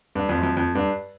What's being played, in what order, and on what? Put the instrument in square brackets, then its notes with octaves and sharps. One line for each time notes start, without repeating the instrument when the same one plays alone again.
[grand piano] G2
F2
F#2
F2
F2
G2